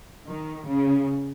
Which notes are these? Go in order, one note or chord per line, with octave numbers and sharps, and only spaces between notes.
D#3
C#3